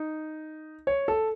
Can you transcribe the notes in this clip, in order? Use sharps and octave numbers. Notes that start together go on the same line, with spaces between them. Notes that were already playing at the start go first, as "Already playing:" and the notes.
Already playing: D#4
C#5
A4